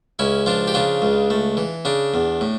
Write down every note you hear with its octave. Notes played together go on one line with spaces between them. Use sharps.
C#2 C#4 E4
F3 D4 F4
G4
C#3 D4 F4
C#2
A3
E3
C#3 D4
E2
A2